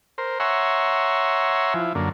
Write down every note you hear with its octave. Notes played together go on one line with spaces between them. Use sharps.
A#4 C5
C#5 E5 F#5 G#5 A#5 C6
F3 E4
F#2 D3 A#3